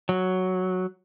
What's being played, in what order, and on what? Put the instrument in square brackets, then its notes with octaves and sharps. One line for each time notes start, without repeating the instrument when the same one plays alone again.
[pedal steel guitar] F#3